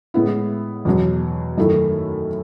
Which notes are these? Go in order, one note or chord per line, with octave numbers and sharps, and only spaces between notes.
A2 G#3 B3 E4
E2 B2 F#3
F#2 D#3 A3 E4 A4